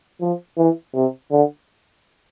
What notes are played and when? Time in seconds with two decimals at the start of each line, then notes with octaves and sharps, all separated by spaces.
0.21 F3
0.58 E3
0.94 C3
1.32 D3